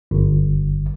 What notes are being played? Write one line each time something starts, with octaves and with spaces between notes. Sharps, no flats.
G1